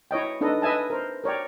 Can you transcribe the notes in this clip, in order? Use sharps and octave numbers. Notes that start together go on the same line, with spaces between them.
E4 C#5 D#5 G5
D4 D#4 A4 B4 D#5
B4 D#5 E5 G#5 A5
A#4 C5
A#4 C#5 D5 G5